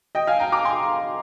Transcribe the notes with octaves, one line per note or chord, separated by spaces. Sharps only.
D#5 G5
F5 G#5
G5 A#5
A#5 D6
G#5 C6